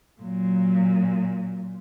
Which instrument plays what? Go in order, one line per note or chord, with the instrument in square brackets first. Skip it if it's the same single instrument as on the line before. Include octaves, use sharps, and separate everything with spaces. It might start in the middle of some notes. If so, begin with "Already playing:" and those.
[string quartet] A#2 [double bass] F#3